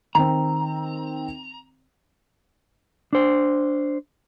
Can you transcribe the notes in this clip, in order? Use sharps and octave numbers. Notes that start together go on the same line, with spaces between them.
D#3 C4 A#5
D4 C5